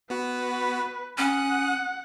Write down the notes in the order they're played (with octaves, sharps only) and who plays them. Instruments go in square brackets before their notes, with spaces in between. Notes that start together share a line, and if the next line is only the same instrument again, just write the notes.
[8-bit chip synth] B3 F#4 [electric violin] B4
[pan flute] C#4 [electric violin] F#5 [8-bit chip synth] D#6 F#6